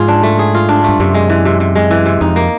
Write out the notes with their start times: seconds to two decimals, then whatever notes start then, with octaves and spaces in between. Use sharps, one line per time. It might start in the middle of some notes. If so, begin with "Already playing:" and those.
Already playing: G#2 F3 F4 G#4
0.08 D4
0.23 A3
0.39 G#4
0.55 F4
0.69 D4
0.84 G2 A3
1.00 F#2 C3
1.14 G#3
1.30 E3
1.45 C3
1.60 C3
1.75 G#3
1.91 E3
2.06 C3
2.21 F2 D#4
2.36 A#3